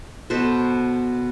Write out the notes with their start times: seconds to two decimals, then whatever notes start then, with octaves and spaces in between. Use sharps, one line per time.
0.30 B2 A4 B4 C5